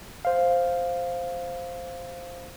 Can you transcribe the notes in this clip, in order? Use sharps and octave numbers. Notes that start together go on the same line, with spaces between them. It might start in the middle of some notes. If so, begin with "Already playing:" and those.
C5 F5